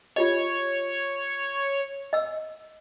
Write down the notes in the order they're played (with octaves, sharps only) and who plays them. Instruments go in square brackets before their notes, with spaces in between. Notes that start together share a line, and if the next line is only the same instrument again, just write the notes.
[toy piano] F4 G4 D#5 [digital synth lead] C#5
[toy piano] D#5 E6